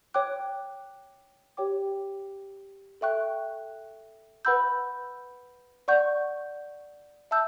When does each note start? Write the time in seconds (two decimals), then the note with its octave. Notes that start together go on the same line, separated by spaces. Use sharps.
0.14 C#5 G5 D6 F#6
1.57 G4 C#5 G5 D6
3.01 A4 E5 G5 C#6 F#6
4.45 B4 F#5 B5 E6 G6
5.88 D5 F#5 C#6 G6
7.31 E5 A5 E6 G6